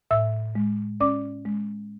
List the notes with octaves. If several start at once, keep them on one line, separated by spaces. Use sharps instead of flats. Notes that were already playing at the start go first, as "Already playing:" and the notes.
A2 E5 E6
G#3
C#4 D5 D6
G#3